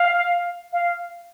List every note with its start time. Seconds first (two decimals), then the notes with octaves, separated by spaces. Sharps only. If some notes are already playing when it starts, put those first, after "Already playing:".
Already playing: F5
0.73 F5